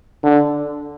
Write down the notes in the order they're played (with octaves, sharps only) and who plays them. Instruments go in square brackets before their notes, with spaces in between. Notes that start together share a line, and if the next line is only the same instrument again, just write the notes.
[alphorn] D3